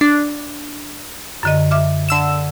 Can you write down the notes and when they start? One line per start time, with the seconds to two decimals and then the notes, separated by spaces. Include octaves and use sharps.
0.01 D4
1.43 F#2 D3 D#5
1.71 E5 D6 F6
2.09 D3 E6 E7